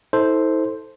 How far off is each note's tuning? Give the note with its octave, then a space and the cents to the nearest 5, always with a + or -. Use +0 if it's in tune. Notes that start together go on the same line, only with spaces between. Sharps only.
E4 -45 A4 +0 C5 +0